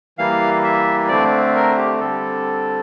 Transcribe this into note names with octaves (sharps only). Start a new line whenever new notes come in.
E3 G3 A#3 F5
E5
D3 A3 C4 D5
A#4
G4
D3 G3 C4 A4